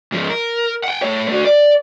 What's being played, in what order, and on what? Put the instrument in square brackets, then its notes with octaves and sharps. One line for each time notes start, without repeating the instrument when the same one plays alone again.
[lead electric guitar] G#2 F3
A#4
F#5 G5
A3 C#5
A3 F#4
D5